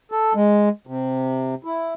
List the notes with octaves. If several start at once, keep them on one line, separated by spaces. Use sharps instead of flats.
A4
G#3
C3
E4